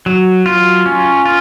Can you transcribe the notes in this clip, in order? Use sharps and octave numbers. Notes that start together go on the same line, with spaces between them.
F#3
F4
C#4
F4